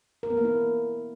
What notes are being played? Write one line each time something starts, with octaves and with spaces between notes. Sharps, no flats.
A#4
B3
A#3
E4